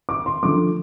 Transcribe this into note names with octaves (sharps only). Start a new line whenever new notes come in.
D6
C6
D3 F3 A3 D6